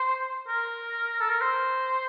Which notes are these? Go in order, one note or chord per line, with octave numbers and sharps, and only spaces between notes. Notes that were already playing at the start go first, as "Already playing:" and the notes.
Already playing: C5
A#4
A4
A#4
C5